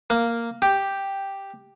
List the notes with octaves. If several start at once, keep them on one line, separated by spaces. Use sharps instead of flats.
A#3
G4